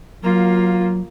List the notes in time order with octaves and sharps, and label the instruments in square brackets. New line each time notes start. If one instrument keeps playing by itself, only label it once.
[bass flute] F#3 [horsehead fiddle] A#3 F4